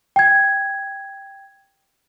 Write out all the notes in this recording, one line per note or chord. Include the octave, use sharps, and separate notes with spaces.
G5 G#6